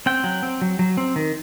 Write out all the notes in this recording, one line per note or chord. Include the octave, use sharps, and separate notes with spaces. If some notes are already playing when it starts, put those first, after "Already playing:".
C4 G5
F#3
C4
F#3
F#3
C4
D#3